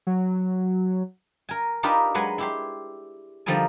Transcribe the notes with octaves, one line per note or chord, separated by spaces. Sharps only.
F#3
A#4 G#5
D4 D#4 F4 G4 A#4 B4
F#3 G#3 B4 F#5 G#5
E4 G4 C6
D3 F3 G3 D#4 A#4 G#5